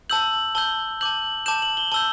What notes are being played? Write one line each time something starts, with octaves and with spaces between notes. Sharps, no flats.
A5 E6 G6 F#7
A5 E6 G6 G7
A5 D6 G6 F#7
A5 D6 G6 E7
F#7
G7
A5 E6 G6 G7